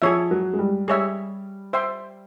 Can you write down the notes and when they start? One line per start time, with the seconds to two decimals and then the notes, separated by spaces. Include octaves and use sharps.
0.02 F3 G#4 C#5 E5
0.31 F#3
0.53 G#3
0.59 G3
0.87 G3 G#4 C#5 E5
1.73 C5 E5 G5 C6